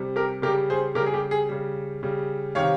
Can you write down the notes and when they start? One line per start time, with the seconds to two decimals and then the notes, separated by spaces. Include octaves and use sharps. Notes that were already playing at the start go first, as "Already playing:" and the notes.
Already playing: C3 G3
0.16 G4 A#4
0.42 C#3 G4 A#4
0.47 G3
0.70 G#4 C5
0.95 C#3 G4 A#4
1.00 G3
1.06 G#4
1.14 G4
1.31 G#4
1.49 C#3 G3
2.03 C#3 G3
2.55 C3 D#3 G3 C#5 F5